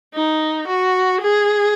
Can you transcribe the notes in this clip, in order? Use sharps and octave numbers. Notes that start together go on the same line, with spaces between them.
D#4
F#4
G#4